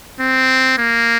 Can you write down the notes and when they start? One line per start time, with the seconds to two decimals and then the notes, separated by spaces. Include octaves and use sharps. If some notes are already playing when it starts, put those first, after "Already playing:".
0.20 C4
0.78 A#3